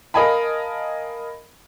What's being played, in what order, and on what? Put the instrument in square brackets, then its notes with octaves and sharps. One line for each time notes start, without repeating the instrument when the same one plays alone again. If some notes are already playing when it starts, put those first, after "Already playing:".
[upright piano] A#4 D#5 F5 G#5 A5 B5